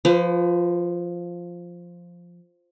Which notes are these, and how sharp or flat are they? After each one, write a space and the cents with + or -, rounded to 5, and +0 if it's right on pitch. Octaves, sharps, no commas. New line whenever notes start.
F3 +0 B4 +35